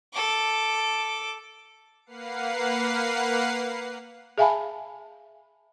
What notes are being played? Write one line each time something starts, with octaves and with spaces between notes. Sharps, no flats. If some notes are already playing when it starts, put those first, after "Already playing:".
A4 D6
A#3 B4 F5 F#5 C7
G#4 E5 F5 G#5 A5 B5